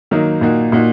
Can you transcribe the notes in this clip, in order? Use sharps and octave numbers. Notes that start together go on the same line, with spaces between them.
D#3 F#3 A#3 D#4
A#2 A#3 D#4 F#4
A#2 A#3 D#4 F#4